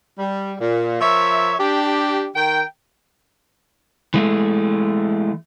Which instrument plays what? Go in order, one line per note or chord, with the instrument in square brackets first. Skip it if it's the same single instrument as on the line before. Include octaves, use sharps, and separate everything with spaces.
[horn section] G3
A#2
F3 A#4 C#5 E5
D4 G4
D#3 A#4 G5
[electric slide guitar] E3 G#3 A3